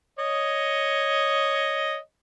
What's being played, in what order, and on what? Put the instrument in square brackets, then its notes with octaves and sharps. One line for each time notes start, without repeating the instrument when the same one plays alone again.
[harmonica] C#5 D#5